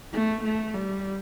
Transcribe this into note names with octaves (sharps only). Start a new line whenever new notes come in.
A3
A3
G3